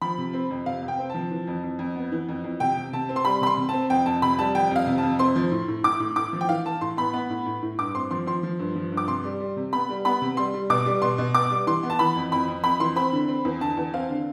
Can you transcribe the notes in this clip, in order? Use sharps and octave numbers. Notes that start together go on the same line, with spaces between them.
F3 B5
C3
C4
F2
C3 F5
C3
G5
C4
F3 A5
E3
F2
F2
F2
B3
E3
F2
F2
C3 G5
C3
C3 A5
C4
C6
G3 B5
C3 B5
C6
C3
C4 A5
F2 G5
F2 A5
C3 B5
G3 A5
F2 G5
F2 F5
C3
F2 A5
C4 C6
F3
A2
A2
A2 D6
A2
A2 D6
F3
G5
E3 F5
E3 A5
A2 C6
B3 B5
B3
A2
A2
A2
G2 D6
C4 C6
F3 C6
F3 C6
F3
G2
F3
G2
D6
C3 C6
G3
G3
C3
B3 B5
G3
B3 B5
C3
G3 C6
G3
B2 D6
G3
B2 C6
B2
B2 D6
G3
E3 C6
B3
A5
E3 B5
F2
F2 B5
F2
F2 B5
E3 C6
C4 B5
D3
C4
E2
D3 A5
E2
C4 F5
D3